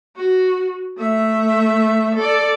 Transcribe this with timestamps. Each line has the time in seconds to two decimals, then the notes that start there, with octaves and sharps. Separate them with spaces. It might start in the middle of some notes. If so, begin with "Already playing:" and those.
0.16 F#4
0.97 A3 E5
2.15 A4 D5